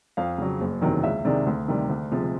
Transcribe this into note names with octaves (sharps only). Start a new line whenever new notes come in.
F2 F5
C#3 F#3
F#1
E2 C3 D#3 F#3
C#2 E5
C3 D#3 G#3 D5
D2
C3 D#3 G3
D2
C3 F3 G#3